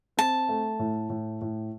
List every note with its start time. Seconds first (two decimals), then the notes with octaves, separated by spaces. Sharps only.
0.17 C4 A5
0.49 A3
0.79 A2
1.10 A2
1.41 A2